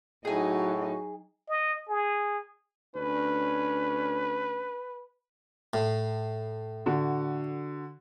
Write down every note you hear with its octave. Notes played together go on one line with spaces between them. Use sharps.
A2 F#3 D#4 F#4 G#4 G#5
D#5
G#4
D2 C#4 D4 B4
A2
D3 F#4